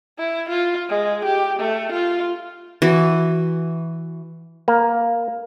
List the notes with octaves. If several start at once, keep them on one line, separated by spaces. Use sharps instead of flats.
E4
F4
G#3
G4
A3
F4
E3 F#4
A#3